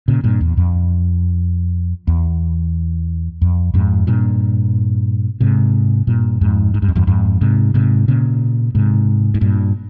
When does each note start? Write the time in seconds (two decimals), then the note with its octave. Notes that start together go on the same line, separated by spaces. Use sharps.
0.08 A#2 C#3
0.24 G2 A#2
0.41 E2
0.57 F2
2.07 E2
3.42 F2
3.74 F2 G#2
4.07 G2 A#2
5.40 G#2 C3
6.07 G2 A#2
6.41 F2 G#2
6.74 G#2
6.82 G2
6.88 F2
6.96 E2 G2
7.07 F2 G#2
7.41 G#2 C3
7.74 G#2 C3
8.08 A#2 C#3
8.75 G#2 C3
9.34 G#2
9.41 G2 A#2